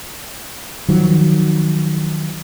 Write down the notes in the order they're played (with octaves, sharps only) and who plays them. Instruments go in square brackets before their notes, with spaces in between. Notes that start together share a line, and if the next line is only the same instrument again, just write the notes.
[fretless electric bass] D#3 F3 F#3